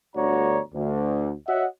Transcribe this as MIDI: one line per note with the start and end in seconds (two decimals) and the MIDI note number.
0.15 0.59 31
0.15 0.59 38
0.15 0.59 66
0.15 0.59 73
0.15 0.59 74
0.15 0.59 82
0.74 1.32 38
1.47 1.65 66
1.47 1.65 73
1.47 1.65 75
1.47 1.65 76
1.47 1.65 78